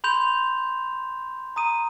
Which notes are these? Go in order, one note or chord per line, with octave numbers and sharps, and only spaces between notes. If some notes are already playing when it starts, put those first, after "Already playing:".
B5 C6 G6 F7
A#5 D#6 D#7